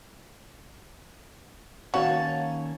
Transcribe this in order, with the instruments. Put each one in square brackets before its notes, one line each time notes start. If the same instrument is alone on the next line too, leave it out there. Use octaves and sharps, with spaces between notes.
[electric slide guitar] D#3 A#3 C#4 [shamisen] F#4 [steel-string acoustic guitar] C#5 A5 [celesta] F5